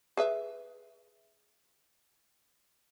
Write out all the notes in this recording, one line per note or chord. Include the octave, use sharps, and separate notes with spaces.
G#4 B4 E5